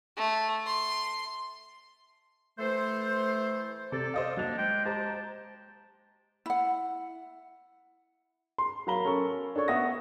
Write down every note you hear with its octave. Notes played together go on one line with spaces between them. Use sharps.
A3
C6
E3 A3 A4 C5
C3 A4 D5
C5 D#5 F5
F#3 A#3 D4 F7
G#3 G5
G4 C5 A5 A#5
E4 F#5
C6
F#3 A#4 F5 A#5 B5 G7
C#4 A4 A#4 C#6
D4 A4 C#5 C#6
B3 E5 F#5 C#6 D#6 A#6